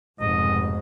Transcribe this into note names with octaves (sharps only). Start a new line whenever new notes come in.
F1 G#2 B2 D#5